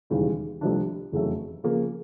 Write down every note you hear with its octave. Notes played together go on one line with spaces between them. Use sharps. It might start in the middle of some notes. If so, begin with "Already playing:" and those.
E1 D#2 C#3 E3 G3
C2 C3 F3 A3 D4
F1 E2 C#3 F#3 A3
C#3 F3 A#3